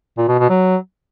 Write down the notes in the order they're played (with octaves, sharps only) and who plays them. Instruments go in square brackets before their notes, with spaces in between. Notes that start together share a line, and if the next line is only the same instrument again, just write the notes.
[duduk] A#2
B2
B2
F#3